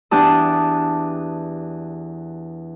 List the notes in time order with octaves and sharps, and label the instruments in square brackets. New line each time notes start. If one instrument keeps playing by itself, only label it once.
[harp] E2 D4 G4 A5 D#6